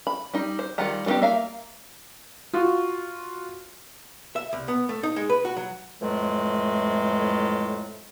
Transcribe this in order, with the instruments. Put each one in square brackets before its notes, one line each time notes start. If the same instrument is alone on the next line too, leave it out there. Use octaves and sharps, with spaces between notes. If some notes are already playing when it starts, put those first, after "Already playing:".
[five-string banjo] B5
G3 D#4
C5
D#3 G3 F4 F#5 A#5
G3 A3 B3 D#4 G4
A#3 E5 F5 A#5
[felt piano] F4 F#4
[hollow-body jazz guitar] E5
C2
B3
A3
D#4
G#3
B4
F#4
F#3
[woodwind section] F2 A2 E3 F#3 G#3 A3